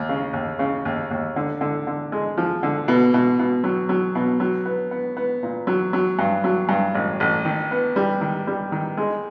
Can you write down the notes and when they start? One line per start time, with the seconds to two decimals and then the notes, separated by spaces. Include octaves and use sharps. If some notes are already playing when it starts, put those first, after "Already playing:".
Already playing: D#2
0.09 C#3
0.33 D#2
0.59 C#3
0.85 D#2
1.11 D#2
1.36 D3
1.61 D3
1.87 D3
2.12 G#3
2.38 F3
2.63 D3
2.88 B2
3.14 B2
3.40 B2
3.64 F#3
3.89 F#3
4.15 B2
4.40 F#3
4.66 B3
4.91 B3
5.17 B3
5.43 A#2
5.67 F#3
5.93 F#3
6.19 G2
6.44 F#3
6.69 G2
6.95 A1
7.20 A1
7.45 D#3
7.71 B3
7.96 G3
8.21 D#3
8.47 G3
8.72 D#3
8.97 G#3